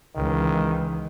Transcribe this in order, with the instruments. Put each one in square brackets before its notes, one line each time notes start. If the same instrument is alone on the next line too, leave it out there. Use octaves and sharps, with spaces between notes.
[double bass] C#2 E3 [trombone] D#3